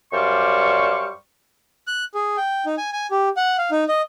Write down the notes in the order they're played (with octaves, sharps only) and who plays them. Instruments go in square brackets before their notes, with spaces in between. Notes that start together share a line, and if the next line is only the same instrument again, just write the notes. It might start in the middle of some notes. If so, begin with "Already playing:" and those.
[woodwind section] F#2 G3 C5 D5 F5 C#6
[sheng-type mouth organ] F#6
G#4
G5
D#4
G#5
G#5
G4
F#5
F5
D#4
D#5